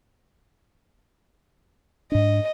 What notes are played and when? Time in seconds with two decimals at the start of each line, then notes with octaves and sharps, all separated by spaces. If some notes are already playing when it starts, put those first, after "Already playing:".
2.12 G#2 D4 D#5